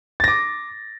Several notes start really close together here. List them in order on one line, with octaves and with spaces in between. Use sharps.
A6 A#6 D6